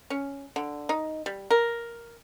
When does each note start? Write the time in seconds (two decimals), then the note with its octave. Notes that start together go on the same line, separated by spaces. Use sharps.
0.10 C#4
0.56 D3
0.89 D#4
1.26 G3
1.51 A#4